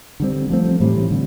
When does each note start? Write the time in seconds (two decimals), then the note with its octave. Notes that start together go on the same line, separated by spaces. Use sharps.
0.20 D3 G3 C4
0.50 F3 A3 C4
0.80 A2 E3 G3 C4
1.11 D3